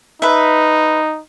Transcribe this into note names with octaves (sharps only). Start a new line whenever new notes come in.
D#4 B4 E5